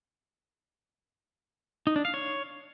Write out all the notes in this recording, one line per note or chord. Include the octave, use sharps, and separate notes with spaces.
D#4
D4
F5
C#5